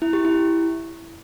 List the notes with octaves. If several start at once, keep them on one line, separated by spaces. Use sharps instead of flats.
E4
G4
E4